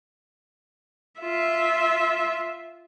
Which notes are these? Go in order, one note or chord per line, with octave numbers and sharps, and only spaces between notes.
F4 E5